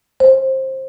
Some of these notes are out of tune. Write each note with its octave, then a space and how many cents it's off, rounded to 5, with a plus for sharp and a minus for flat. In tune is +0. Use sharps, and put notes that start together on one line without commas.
C5 +20